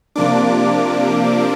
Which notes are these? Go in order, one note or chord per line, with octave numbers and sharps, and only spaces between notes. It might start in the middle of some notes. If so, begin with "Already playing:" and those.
C3 F3 A#3 D4 D6